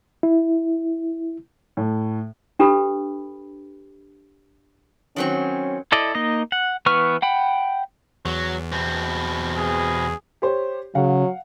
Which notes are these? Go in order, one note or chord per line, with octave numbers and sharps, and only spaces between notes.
E4
A2
D4 G4 A4 B4 B5
D#3 F#3 C4 C#4
E4 A4 D5 D#5
A#3 D#4 D#5
F#5
E3 B3 B4 C#6 F6
F#5 G5 B5
E2 F#3
B2 C4
G#4
G4 C5 C#5
C#3 F#3 F5 F#5